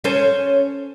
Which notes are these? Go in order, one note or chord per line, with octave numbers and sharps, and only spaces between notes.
C#4 A4 C5